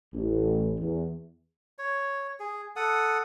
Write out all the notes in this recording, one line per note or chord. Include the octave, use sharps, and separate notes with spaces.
A1
E2
C#5
G#4
A4 F#5 D#6